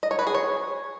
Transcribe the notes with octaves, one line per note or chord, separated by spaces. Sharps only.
D#5
C#5
B4
G#4
C#5